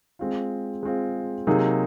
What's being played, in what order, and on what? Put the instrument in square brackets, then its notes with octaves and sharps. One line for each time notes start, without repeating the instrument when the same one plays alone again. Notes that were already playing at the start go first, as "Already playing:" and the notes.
[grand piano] G#3 C4 F4
G#3 C4 F4
C3 F#3 A#3 D#4 G#4